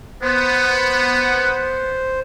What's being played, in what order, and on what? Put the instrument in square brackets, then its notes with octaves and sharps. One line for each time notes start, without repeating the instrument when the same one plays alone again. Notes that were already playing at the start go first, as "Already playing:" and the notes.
[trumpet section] B3 [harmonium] C5